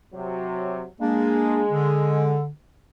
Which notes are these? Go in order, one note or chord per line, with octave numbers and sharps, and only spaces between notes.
C3 F#3
G#3 A#3 D4
D3